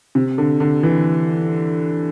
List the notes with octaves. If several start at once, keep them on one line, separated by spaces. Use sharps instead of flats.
C3
D3
D3
E3